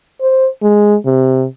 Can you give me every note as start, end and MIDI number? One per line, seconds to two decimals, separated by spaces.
0.21 0.48 72
0.63 0.96 56
1.05 1.45 48